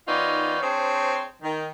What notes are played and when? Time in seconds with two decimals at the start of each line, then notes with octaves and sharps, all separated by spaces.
0.08 D#3 B3 C#4 D#4 F4 D5
0.61 C4 D4 G#4 C5 C#5
1.42 D#3